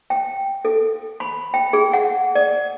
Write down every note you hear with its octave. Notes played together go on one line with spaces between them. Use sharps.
G5
A4
B5
G5
G#4
F#5
D5